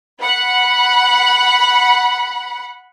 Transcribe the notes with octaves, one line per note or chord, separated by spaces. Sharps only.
F#5 B5